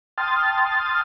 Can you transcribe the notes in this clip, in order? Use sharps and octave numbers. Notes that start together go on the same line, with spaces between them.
G5 A5 C6 D#6 F6 A6